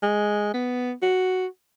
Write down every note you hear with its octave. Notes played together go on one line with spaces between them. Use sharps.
G#3
B3
F#4